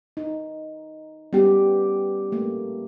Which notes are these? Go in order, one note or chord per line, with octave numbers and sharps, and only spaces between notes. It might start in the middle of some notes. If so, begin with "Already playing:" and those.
D#4
G3 B3 C#4 G4
A3 A#3